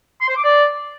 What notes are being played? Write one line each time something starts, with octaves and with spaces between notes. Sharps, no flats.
C6
C5
D6
D5